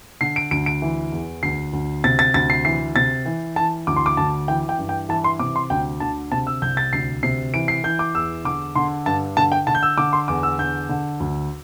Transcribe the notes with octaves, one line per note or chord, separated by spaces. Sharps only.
D3 C7
D7
D2 D7
D7
E3
E2
D2 C7
D2
C3 A6
A6
D2 A6
C7
E3 C7
C3 A6
E3
E3 A5
D2 D6
C6
D6
D2 A5
E3 G5
G5
G2
G5
E3 A5
C6
C3 D6
C6
D2 G5
D3 A5
C3 A5
E6
C2 G6
A6
D2 C7
C3 C7
E3 D7
C7
E3 G6
D6
E2 E6
D3 D6
D3 C6
G2 A5
D3 A5
G5
D3 A5
G6
E6
D3 D6
C6
E2 D6
E6
D3 G6
D3
D2